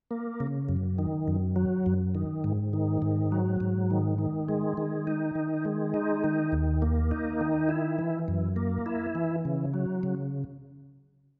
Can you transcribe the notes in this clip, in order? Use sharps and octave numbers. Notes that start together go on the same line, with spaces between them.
A#3
C#3
F#2
D#3
F#2
F#3
F#2
D#3
G#2
D#3
G#2
F#3
G#2
D#3
D#3
G#3
D#3
D#4
D#3
G#3
D#4
D#3
D#2
A#3
D#4
D#3
E4
E3
F#2
A#3
E4
E3
C#3
F#3
C#3